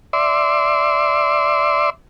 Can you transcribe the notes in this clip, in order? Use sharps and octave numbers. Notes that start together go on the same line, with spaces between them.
D5 E5 C6